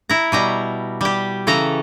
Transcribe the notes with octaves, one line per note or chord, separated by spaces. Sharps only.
E4 A#5
B2 G3 A#5
G3 G4
C#3 E3 A4 A#5